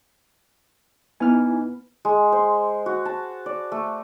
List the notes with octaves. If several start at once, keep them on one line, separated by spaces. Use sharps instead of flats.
B3 D#4 E4 G#5 F6
G#3
C5
F#4
A5
D5
A3